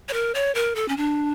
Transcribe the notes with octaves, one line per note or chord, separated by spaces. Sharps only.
C#5
A#4
C#5
A#4
A4
C#4
D4